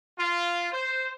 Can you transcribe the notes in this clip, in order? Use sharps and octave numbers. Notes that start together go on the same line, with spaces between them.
F4
C5